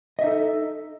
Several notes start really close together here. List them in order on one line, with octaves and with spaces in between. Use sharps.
D#5 E5 D#4 A4